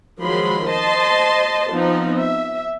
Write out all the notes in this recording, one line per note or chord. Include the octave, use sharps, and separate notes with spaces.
D#3 F3 F#3 G#3 B5 C6
C5 D#5 A5 C6
F3 B3 C4 D#4
E5